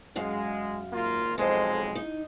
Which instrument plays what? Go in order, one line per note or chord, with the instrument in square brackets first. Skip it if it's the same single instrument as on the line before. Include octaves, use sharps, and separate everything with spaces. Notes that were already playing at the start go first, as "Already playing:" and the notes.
[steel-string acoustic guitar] F#2 F5 [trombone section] G#3
[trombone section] G#1 A#3 F4
[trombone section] B1 F2 G#3 [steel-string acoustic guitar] A4 C5 D#5
[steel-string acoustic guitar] D#4